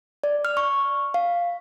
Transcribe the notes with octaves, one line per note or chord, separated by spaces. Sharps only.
D5
F6
C#6
F5